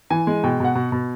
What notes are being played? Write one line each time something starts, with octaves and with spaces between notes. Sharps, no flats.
E3 G#5
G#3
B2 G5
B2 F#5
B2
B2